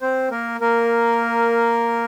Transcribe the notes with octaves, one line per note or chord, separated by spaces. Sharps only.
C4 C5
A#3 A#4
A#3 A#4